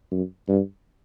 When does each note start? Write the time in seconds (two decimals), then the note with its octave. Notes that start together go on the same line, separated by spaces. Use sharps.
0.11 F#2
0.48 G2